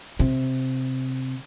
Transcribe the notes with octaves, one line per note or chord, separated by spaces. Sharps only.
C3